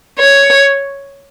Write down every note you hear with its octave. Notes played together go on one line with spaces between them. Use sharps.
C#5